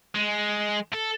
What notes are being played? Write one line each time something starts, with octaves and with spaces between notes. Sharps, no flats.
G#3
A4